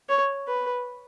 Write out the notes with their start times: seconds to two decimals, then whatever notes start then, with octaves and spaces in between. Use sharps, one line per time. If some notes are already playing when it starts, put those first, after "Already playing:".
0.09 C#5
0.47 B4